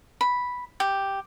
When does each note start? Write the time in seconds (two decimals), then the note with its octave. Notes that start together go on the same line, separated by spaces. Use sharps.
0.21 B5
0.80 G4